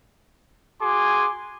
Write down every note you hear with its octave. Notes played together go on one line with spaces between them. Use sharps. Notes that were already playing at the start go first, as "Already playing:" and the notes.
F#4 G#4 G#5 C6 D6